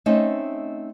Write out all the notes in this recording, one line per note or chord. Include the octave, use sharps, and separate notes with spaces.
A3 C4 C#4 D#4 D#5